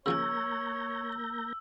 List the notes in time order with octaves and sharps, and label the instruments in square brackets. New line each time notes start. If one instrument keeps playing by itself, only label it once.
[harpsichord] C#3 F3 C#4 [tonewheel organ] A#3 A#5 G6 [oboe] C#5 [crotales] E6